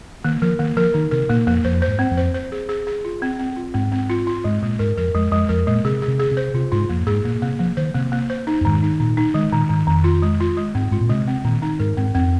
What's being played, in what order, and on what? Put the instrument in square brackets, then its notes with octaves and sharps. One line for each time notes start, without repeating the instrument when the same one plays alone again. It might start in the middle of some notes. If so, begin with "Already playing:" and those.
[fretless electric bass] D#3 [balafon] A#3
[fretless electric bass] F3 [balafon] A#4
[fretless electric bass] D#3 [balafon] A#3
[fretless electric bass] F3 [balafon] A#4
[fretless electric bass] D#3 [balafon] D#4
[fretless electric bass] C3 [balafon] A#4
[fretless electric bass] A#2 [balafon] A#3
[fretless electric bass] F2 [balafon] A#3
[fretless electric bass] F2 [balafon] C5
[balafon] C5
[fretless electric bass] G#2
[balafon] C4
[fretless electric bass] F2
[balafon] C5
C5
G#4
G#4
G#4
F4
C4
C4
F4
[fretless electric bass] G#2 [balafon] C4
[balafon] C4
F4
F4
[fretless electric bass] G#2 [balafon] G#3
[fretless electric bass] A#2 [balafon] G#3
[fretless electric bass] G#2 [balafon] A#4
[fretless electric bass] F2 [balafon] A#4
[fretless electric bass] F2 [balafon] G#3
[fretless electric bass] F2 [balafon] G#3
[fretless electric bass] F2 [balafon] A#4
[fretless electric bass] A#2 [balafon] G#3
[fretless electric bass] C3 [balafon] G#4
[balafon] G#4
[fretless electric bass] C3
[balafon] G#4
[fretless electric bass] C3
[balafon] C5
[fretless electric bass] C3 [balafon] F4
[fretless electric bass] G#2 [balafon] F4
[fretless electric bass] F2 [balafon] A#3
[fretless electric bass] G#2 [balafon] G#4
[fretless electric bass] A#2 [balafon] A#3
[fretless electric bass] C3 [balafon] A#3
[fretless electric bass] F3 [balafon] A#3
[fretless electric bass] D#3 [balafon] C5
[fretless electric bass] C3 [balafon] A#3
[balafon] A#3
C5
D#4
[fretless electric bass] F2
[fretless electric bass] G#2 [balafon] D#3
[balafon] D#4
[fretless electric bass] A#2 [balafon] D#4
[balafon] D#4
[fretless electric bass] D#3 [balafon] G#3
[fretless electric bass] A#2 [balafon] D#3
[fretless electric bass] G#2 [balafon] D#3
[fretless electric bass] F2 [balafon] D#3
[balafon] F4
G#3
F4
G#3
[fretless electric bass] G#2 [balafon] C4
[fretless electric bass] G#2 [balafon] F4
[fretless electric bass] A#2
[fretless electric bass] C3 [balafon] G#3
[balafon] C4
[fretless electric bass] A#2 [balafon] D#3
[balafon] D#4
[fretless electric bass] G#2 [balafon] A#4
[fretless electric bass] G#2 [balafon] C4
[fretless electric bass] F2 [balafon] C4